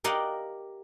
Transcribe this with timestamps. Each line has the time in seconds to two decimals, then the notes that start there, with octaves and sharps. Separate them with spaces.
0.04 G4 A#4 D5 D#5 F5 F#5